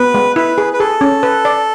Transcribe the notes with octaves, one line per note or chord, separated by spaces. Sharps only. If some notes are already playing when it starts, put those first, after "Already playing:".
Already playing: B3 B4
G#3
E4 B4
G#4
B4
G#4 A4
C#4
B4
D5